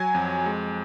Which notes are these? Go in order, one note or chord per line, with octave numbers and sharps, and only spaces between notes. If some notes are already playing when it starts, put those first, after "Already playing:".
Already playing: F#3 G#5
F2
G#3